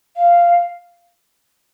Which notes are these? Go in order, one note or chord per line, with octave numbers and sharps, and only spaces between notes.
F5